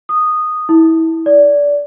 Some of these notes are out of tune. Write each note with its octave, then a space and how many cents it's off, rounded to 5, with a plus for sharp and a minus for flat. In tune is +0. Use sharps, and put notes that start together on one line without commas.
D#6 -10
E4 -30
D5 -20